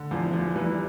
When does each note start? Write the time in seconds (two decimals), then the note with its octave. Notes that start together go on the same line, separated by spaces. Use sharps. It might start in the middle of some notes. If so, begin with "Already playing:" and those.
Already playing: D3
0.11 E2 F3
0.33 F3
0.55 E3 G3